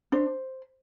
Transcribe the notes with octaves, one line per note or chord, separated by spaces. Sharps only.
D4 C5